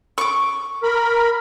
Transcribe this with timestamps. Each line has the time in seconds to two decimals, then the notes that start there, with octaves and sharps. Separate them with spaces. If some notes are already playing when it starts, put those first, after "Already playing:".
0.18 C#6 D6
0.83 A#4 B5